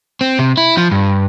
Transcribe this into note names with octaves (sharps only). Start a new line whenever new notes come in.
C4
C3
E4
F3
G2